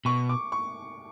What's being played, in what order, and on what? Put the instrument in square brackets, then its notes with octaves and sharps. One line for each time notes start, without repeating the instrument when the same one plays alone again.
[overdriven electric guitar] B2 [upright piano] C#6
[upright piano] D6
C#6